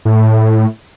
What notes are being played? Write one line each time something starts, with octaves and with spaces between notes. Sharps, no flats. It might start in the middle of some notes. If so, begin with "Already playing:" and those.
A2